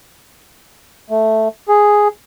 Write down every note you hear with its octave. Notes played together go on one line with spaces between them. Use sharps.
A3
G#4